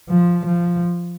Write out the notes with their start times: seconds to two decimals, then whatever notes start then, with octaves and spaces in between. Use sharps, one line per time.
0.09 F3
0.46 F3